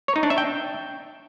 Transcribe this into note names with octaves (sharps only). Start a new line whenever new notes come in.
C#5
D#4
D4
E5
G5